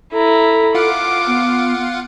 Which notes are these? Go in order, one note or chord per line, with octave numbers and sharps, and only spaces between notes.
E4 A4 A#5
F4 F5 F#5 D6
B3